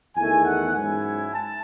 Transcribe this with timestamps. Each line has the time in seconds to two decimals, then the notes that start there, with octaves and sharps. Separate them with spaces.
0.15 E2 D#3 A3 G#5
0.45 F#5
0.74 G#2 F#3 C#4 E4 G#5
1.34 A5